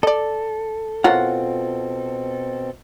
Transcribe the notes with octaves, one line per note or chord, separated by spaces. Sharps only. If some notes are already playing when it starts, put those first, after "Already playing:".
A4 D5 D#5
B2 C4 E4 F4 A#4 C#5 F#5